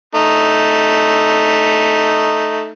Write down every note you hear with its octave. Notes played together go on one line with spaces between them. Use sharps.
A3 D#4